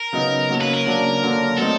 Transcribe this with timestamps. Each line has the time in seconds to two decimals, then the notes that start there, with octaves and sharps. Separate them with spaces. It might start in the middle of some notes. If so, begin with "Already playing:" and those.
Already playing: A#4
0.13 C#3 F#3 B3 D#4
0.49 C#3 F#3 A#3 C#4
0.61 B4
0.74 A#4
0.85 C#3 F#3 A#3 D4
1.22 D3 F#3 A#3 D4
1.58 F#3 A3 C4 D#4 A4